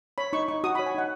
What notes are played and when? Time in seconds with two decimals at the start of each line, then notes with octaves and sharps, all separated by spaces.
0.18 C#5 B5
0.33 D#4 C#6
0.48 D#4 C#6
0.64 F#4 D#6
0.75 B5
0.79 C#5
0.86 G#5
0.94 D#4 F#5